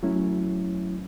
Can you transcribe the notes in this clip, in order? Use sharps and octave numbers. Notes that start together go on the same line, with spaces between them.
F#3 A3 C#4 E4